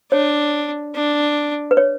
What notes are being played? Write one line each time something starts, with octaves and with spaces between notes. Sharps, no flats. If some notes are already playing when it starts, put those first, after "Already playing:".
D4 C#5
D4
B4
C#5